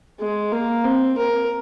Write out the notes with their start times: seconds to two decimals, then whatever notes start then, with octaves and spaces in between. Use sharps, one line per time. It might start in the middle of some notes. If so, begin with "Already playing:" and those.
0.20 G#3
0.52 A#3
0.84 C4
1.17 A#4